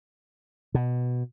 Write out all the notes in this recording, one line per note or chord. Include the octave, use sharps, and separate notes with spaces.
B2